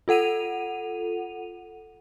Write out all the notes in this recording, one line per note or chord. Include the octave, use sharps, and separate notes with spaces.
F4 A4 F#5 D#7 F7